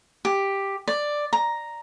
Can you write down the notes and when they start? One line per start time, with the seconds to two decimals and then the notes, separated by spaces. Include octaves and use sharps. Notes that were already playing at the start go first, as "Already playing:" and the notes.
0.25 G4
0.88 D5
1.33 A#5